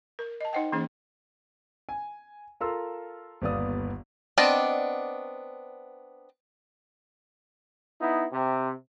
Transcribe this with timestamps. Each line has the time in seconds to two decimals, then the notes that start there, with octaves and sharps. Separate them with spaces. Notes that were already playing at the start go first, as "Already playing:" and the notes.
0.19 A#4
0.41 D#5 A5
0.53 D#4 C5 D#5 F#5 G5
0.72 E3 A#3 C#4 G#4 C5
1.89 G#5
2.61 F4 A4 A#4 A#5 C6 E6
3.42 G1 D#2 B3 D5 F5 D#6
4.38 B3 C4 D4 D5 D#5
8.00 B3 D#4 E4
8.32 C3